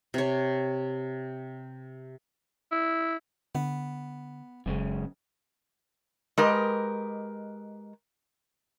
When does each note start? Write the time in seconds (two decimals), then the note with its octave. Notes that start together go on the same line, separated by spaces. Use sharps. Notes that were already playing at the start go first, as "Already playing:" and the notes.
0.14 C3 C#5
2.72 E4
3.55 D3 B3
4.66 F1 F#2 C#3 G#3
6.38 G#3 G4 A#4 B4 D#5